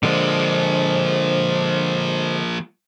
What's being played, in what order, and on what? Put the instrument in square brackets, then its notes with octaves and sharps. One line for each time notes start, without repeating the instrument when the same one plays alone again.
[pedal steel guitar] D3 G#3 [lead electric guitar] F3 A#3 [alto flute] C5